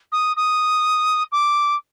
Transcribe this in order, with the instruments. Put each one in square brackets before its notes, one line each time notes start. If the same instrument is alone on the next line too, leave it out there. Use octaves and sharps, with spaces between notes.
[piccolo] D#6
D#6
D6